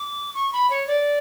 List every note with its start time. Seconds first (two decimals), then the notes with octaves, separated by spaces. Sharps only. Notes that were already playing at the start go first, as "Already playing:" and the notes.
Already playing: D6
0.35 C#6
0.53 B5
0.70 C#5
0.87 D5